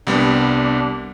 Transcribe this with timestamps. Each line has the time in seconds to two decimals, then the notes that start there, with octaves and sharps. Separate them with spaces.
0.07 C2 G3 B3 D4